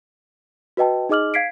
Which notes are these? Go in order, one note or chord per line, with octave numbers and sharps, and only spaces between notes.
F#4 B4 D#5 G5 A5
D#4 G#4 D#5 D6 F6 F#7
F5 G#6 B6 C7 D7